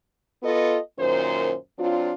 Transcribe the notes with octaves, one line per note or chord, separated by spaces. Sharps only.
B3 F4 A4 D#5
F#2 A#2 D#3 C5
F#3 C4 D4 F4